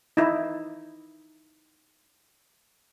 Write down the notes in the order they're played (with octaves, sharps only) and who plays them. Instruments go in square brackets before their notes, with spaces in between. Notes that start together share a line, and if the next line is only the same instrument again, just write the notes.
[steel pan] D#4 E4